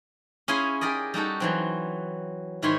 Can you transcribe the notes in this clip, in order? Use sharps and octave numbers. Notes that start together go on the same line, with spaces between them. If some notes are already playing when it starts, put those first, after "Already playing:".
C#4 E4 G#4 F5 G#5 C6
G4 G#4 A#4 D5 D#5
G3 D#4 F#4 A4
E3 F#3 C4
G#2 D#3 E4 C#5 E5 C6